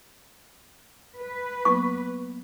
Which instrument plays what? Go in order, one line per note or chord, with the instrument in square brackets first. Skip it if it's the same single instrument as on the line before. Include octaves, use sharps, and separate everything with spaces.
[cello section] B4
[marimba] F#3 A#3 B3 [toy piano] C#6